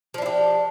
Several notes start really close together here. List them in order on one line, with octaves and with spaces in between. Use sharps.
F3 D4 E4 G4